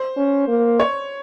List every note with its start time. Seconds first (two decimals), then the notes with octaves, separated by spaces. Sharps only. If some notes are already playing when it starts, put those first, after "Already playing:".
Already playing: C5
0.17 C#4
0.47 A#3
0.80 C#5